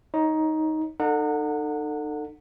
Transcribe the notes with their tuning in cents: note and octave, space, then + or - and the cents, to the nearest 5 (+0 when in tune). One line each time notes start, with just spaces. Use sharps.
D#4 +10 C#5 +0
D#4 -40 A4 +25 F#5 -15